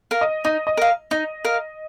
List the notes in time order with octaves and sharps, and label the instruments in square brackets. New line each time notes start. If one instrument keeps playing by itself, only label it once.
[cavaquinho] A#4 F5
[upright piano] D#5
[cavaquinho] D#4 [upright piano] D#5
[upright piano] D#5
[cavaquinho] A#4 F5
[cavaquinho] D#4 [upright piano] D#5
[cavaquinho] A#4 F5